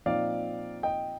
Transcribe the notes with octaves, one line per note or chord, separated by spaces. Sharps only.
A#2 F3 C4 D#4 D5 F5
D#5 G5